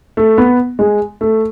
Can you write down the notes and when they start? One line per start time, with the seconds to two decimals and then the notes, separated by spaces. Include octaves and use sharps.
0.17 A3
0.38 B3
0.79 G#3
1.21 A3